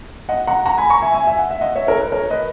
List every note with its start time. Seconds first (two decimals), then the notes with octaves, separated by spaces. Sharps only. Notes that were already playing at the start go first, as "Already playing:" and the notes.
0.29 D#5 F#5
0.47 F#5 A#5
0.65 F#5 A#5
0.78 G#5 B5
0.90 A#5 C#6
1.02 E5 G#5
1.14 E5 G#5
1.27 E5 G#5
1.39 F#5
1.51 E5
1.61 D#5 F#5
1.75 C#5 E5
1.87 A#4 C#5
2.00 B4
2.12 A#4 C#5
2.30 B4 D#5